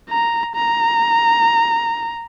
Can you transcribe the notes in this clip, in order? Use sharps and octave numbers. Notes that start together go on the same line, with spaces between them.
A#5
A#5